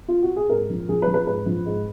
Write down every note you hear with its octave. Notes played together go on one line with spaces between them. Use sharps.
F4
F#4
G#4
G#2 A#4
F3
F3 G#4
B4
F3
B4
G#2 B4
F3
G#2